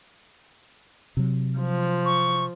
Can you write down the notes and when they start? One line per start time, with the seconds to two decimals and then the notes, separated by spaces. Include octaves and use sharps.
1.17 C3 F#3
1.59 F3
2.05 C#6